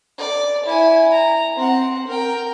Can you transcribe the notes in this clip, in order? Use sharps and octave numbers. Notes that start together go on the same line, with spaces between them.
D5
E4 G#5
A#5
C4 F#5
A#4 G5